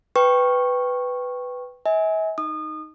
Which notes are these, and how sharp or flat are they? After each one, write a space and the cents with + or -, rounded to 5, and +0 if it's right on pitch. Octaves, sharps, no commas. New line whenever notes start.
B4 +10 G5 +0 C#6 -15
E5 -45 G#5 +0
D#4 +0 D#6 -30